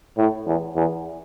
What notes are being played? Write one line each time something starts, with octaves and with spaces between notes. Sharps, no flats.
A2
E2
E2